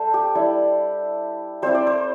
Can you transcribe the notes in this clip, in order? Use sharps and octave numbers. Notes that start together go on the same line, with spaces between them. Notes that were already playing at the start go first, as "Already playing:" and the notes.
Already playing: G3 D4 A4 C5 E5 G5
G4
G3 E4
G3 C4 E4 C5
D5
C5